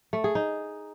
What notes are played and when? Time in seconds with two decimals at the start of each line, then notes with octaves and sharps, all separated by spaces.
0.13 A3
0.24 G#4
0.35 D#4